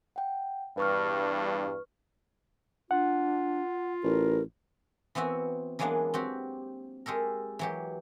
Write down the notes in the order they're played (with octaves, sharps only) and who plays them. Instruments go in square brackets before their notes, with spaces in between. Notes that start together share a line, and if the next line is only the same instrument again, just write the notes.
[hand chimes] F#5 G5
[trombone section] E2 G2 [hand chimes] B4 C#6 F6
[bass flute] D4 [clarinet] F4 [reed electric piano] F#5
[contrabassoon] A1 [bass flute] A#4
[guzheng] E3 B3 C4 F#4 E5
E3 F#3 G#3 A#3 B3 D4
C4 F#4 G4
G#3 G4 A4 A#4
E3 F#3 G4